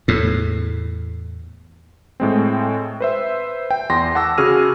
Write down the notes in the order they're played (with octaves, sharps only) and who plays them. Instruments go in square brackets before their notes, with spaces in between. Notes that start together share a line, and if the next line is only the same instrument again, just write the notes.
[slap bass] E2 A2
[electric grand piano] A2 G#3 C4
B4 C5 E5
G5
E2 C6 A#6
F#5 A5 D6 E6 A#6
C#3 F#4 G#4 F6 D#7